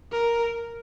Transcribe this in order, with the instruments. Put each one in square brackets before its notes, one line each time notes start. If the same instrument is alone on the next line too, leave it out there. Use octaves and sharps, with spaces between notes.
[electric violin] A#4